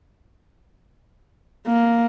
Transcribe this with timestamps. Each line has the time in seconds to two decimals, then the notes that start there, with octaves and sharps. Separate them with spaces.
1.67 A#3